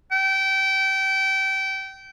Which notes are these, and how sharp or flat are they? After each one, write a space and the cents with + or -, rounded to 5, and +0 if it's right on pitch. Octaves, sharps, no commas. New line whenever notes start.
G5 -25